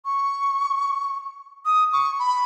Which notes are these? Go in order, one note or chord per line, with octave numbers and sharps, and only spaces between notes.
C#6
D#6
C#6
B5